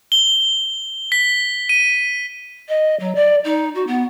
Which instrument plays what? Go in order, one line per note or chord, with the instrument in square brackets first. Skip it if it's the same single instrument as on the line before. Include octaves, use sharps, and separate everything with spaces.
[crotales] G7
B6
D#7
[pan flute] D#5
F#3
D5
D#4
F#4
B3